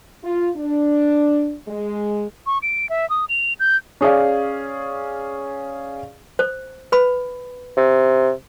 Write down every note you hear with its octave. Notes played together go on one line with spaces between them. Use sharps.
F4
D4
G#3
C#6
D7
E5
D#6
F7
G6
C#4 G#4 D5 F5
C5
B4 B5
C3